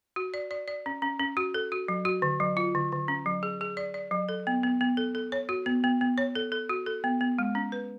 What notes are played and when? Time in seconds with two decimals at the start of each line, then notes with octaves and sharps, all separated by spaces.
0.16 F#4
0.34 D5
0.51 D5
0.68 D5
0.86 C#4
1.02 C#4
1.19 C#4
1.37 F#4
1.54 A4
1.72 F#4
1.88 F#3
2.05 F#4
2.22 D3
2.40 F#3
2.57 F4
2.75 D3
2.92 D3
3.08 C#4
3.26 F#3
3.43 G#4
3.61 G#4
3.77 D5
3.94 D5
4.11 F#3
4.29 A4
4.47 B3
4.63 B3
4.81 B3
4.97 A4
5.15 A4
5.32 C#5
5.49 F#4
5.66 B3
5.84 B3
6.01 B3
6.18 C#5
6.35 A4
6.52 A4
6.69 F#4
6.86 A4
7.04 B3
7.21 B3
7.39 G#3
7.55 C#4
7.72 B4